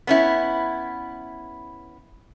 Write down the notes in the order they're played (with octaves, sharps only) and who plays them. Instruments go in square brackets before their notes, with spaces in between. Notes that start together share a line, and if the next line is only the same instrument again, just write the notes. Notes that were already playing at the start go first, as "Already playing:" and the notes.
[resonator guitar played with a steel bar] B3 C#4 E4